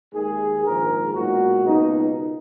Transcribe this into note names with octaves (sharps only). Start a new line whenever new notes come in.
D#2 D#3 G#3 G#4
A#1 G#2 D#3 G#3 A#4
B1 A#2 G#3 F#4
C#2 B2 A#3 D#4